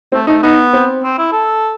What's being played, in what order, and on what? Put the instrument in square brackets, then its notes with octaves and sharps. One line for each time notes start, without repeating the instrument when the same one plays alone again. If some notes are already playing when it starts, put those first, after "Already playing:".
[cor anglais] A3 [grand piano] C4
[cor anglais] A3 [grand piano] D#4
[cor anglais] B3 [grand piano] D#4
[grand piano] C4
[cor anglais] C4
E4
A4